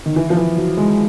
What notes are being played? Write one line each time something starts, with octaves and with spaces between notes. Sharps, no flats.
D#3
E3
F3
E3
F#3
G#3